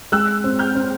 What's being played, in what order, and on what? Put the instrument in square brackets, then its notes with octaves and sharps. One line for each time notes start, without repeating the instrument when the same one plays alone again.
[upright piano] G#3 [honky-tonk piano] E6 F#6
[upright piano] C4
[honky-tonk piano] F6 G6
[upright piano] C4